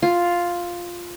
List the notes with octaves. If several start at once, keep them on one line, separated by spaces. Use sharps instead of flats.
F4